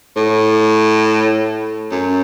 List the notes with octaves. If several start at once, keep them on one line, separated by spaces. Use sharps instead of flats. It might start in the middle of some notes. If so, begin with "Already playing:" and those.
A2
F#2